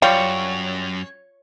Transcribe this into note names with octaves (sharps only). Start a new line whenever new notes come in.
F#2 G3 F4 C#5